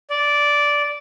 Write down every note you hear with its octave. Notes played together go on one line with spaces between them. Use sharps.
D5